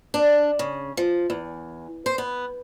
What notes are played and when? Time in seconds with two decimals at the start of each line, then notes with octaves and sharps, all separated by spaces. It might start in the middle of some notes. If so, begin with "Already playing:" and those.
0.14 D4
0.59 C#3
0.97 F3
1.30 E2
2.06 C5
2.18 B3